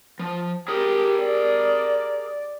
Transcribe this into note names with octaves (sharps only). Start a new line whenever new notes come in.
F3
G4 G#4 A#4
D5